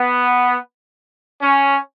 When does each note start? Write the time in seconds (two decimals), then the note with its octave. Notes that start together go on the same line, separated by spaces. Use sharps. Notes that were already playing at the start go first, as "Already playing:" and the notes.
Already playing: B3
1.42 C#4